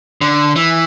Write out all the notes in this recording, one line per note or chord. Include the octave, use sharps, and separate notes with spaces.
D3
E3